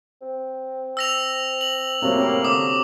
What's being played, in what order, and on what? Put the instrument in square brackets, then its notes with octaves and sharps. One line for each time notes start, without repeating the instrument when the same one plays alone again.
[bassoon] C4
[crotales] E6 A#6 F7
F#7
[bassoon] F#2 [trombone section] A2 G3 A#3 [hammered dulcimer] C3 F#3 F#4
[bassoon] D3 [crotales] D6 D#6